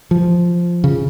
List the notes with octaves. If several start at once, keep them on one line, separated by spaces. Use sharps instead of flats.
F3
C#3